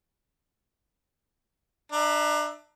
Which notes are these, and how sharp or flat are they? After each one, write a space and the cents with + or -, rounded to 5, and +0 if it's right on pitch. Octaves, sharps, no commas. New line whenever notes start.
D4 +30 E5 -15 A#5 +10